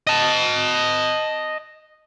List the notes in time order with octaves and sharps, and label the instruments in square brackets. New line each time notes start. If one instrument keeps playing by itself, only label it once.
[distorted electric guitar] D#5 A5